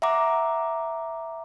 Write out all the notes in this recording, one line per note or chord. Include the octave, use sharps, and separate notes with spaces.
E5 F#5 A#5 D6